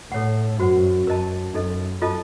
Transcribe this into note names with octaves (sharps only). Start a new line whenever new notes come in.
A2 A4 C#5 F#5
F#2 F#4 C5 F#5
F#2 A#4 D#5 A5
F#2 D#4 A4 D#5
F4 A4 D#5 A5